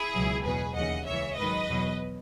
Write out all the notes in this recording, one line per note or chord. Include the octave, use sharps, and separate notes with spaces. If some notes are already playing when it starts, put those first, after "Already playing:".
Already playing: E4 G#4
C#2 B2 F#3
E2 B2 F#3 G#4 B4
D#2 C#3 E3 D#5 F#5
C#2 C#3 E3 C#5 E5
G#2 D#3 F#3 B4 D#5
E2 B2 F#3